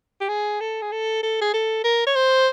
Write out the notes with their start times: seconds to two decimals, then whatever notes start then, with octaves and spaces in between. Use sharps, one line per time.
0.21 G4
0.29 G#4
0.60 A4
0.82 G#4
0.92 A4
1.23 A4
1.42 G#4
1.54 A4
1.84 A#4
2.07 C#5
2.16 C5